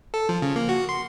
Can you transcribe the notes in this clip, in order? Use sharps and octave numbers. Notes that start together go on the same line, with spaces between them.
A4
F3
C#3
A#3
F#4
C6